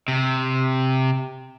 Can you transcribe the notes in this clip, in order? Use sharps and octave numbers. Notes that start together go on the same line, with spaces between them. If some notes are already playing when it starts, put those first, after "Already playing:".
C3